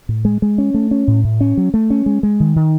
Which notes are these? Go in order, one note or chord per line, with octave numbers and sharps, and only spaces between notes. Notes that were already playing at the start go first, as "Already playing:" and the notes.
A2
G#3
G#3
C#4
A3
C#4
A2
A2
C#4
F#3
A3
C#4
G#3
G#3
D#3
D#3